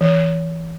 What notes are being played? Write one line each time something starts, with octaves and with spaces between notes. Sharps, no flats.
E3